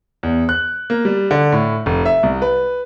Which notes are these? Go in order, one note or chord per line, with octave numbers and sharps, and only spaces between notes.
E2
F#6
A#3
G3
D3
A2
F1
E5
C2
B4